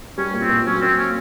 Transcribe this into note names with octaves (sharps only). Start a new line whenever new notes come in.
G3 C#4
A#2
C4
A#2
F#3 C#4
A#3 C4
A#3 C#4